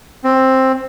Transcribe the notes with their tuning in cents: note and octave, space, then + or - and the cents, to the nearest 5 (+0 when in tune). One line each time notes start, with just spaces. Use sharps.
C4 +10